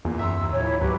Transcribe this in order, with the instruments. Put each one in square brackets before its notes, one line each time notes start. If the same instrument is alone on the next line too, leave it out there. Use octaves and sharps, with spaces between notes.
[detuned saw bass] E2 [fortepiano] A#2
[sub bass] F#2 [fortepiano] E5 A#5 C6 [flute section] E6
[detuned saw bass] D#2
[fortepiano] A#1 E3 [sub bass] A2 [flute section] E4 C#5
[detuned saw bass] C#2 [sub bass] G#2 [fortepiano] F#3 [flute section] G4 B4